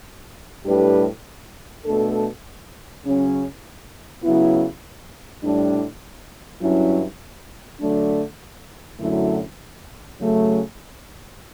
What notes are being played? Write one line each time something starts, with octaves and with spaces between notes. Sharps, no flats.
A2 G3 D4 G4 B4
B2 A3 D4 A4
C#3 F#3 C#4
C#3 F#3 B3 E4
A2 G3 D4
G2 F#3 C#4 E4
D3 F#3 A3 D4
F#2 D3 F#3 A3 E4
C#3 F#3 A3 C#4